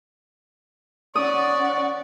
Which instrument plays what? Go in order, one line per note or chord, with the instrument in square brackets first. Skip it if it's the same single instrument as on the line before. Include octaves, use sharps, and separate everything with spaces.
[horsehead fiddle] C#4 F#5 [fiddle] D5 [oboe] C#6 [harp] D#6